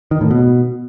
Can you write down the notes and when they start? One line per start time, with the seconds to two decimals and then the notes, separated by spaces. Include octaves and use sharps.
0.11 D#3
0.21 A2
0.31 B2